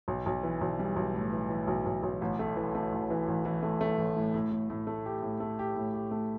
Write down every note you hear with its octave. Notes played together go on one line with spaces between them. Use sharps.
B1
B1
E3
B1
G3
B1
A2
E3
E3
B1
B1
B1
A1
A3
E3
A3
A1
E3
A1
E3
A3
A3
A1
A2
A2
A2
A2
A3
G4
A2
A3
G4
A2
G4
A3